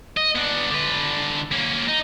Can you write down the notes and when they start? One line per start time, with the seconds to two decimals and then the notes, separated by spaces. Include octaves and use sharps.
0.17 D#5
0.36 B3 D4
0.71 D3 B4
1.52 A#3 C#4
1.88 D#4